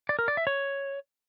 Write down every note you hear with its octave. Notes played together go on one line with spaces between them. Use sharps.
D5
A#4
D5
E5
C#5